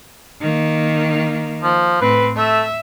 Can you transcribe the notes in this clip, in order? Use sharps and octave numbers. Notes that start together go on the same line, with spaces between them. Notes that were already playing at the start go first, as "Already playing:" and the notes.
D#3 A#3
F3
A2 C4 B4
A3 E5